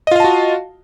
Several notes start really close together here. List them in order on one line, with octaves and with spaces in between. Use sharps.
D#5 F4 F5 A5 F#4